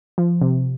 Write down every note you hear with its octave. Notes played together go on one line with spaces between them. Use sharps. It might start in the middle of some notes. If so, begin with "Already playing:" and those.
F3
C3